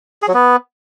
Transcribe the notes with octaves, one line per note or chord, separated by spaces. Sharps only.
G#4
F#3
B3